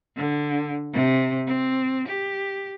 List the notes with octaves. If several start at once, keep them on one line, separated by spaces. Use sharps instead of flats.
D3
C3
C4
G4